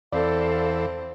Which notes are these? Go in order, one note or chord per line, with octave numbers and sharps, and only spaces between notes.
E2 C4 A4 D5 F5